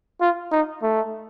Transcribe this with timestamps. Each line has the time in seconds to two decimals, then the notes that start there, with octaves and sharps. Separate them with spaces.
0.21 F4
0.52 D#4
0.83 A3